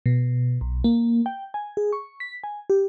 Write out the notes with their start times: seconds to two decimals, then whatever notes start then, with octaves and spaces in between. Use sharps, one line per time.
0.06 B2
0.61 B1
0.84 A#3
1.26 G5
1.54 G#5
1.77 G#4
1.93 C#6
2.20 B6
2.44 G#5
2.70 G4